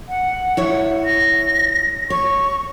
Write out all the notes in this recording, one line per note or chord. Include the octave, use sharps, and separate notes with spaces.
F#5
E4 C#5
A#6
C#5 C#6